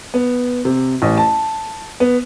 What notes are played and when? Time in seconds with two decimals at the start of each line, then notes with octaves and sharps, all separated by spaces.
0.14 B3
0.65 C3
1.02 A1
1.17 A5
2.00 B3